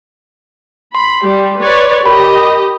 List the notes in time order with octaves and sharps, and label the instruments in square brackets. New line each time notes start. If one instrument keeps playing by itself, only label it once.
[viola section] B5 [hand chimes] C6
[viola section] G3 G4
B4 C#5 D5
[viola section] G4 D#5 [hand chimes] A#4 B5